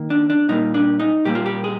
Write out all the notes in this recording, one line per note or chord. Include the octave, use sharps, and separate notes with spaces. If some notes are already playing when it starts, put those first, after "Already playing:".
Already playing: D#3 A#3
D4
D4
A#2 G3 A#3 D#4
D4
D#4
A#2 G3 A#3 G4
F4
G4
G#4